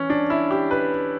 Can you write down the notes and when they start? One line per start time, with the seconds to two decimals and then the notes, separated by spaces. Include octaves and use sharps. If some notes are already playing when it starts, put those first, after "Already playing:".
Already playing: E3 C#4
0.10 D4
0.30 E4
0.51 G4
0.71 B4